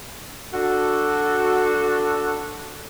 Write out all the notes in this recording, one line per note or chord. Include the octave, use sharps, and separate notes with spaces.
D4 F#4 A4